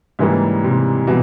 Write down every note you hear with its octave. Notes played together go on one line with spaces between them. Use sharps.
G#2 C#3 E3 G3 A#3
C3
B2 E3 G3